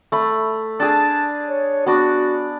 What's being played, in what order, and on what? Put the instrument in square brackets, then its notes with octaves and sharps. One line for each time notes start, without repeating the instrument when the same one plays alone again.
[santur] A3 B5
[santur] D4 G#4 [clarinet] A5
[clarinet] C#5
[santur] B3 D4 [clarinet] F#4